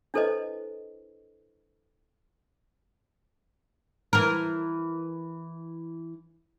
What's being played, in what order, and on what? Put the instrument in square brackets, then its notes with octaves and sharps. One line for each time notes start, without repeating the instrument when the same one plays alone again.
[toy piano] D4 E4 A4 B4 C5 D#5
[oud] E3 A#4